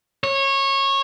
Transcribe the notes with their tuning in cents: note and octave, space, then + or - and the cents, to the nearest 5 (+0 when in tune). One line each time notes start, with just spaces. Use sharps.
C#5 -20